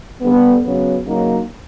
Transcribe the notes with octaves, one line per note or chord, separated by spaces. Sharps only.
G2 D3 G3 B3
C#3 F#3 B3
C#3 F#3 A#3 D#4